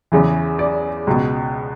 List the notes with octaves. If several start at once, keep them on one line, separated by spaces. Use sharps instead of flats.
E2 C#3 E3
D5
C#2 B2